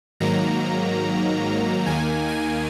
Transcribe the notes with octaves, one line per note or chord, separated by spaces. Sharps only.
G#2 D#3 F#3 A#3 A#5
D#2 D#3 A#3 G#5
G#5